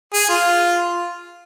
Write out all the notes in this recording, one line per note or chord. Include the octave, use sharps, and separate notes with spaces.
G#4
F4